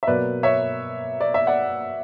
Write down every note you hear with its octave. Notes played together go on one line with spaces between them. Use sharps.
E5
B2 F#3 A#3 B4 D5
C#5 E5
D5
E5
D5 F#5